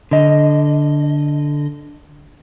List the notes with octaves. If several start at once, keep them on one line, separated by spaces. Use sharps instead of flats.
D3 D#5